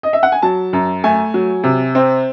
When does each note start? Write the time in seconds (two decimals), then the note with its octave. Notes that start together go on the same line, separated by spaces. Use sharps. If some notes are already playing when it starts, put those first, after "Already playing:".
0.03 D#5
0.13 E5
0.23 F#5
0.32 G#5
0.42 F#3 A5
0.73 F#2
1.04 A3 G#5
1.34 F#3
1.63 C3
1.95 C4